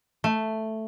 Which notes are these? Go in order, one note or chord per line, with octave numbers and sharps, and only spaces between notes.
A3